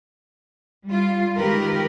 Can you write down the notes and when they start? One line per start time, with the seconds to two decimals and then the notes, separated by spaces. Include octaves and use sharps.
0.86 G3 F4
1.37 D#3 G#3 G4 A#4 B4